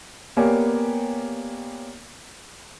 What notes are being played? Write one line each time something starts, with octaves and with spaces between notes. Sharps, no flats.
A#3 B3 G4 C#5 D5 G#5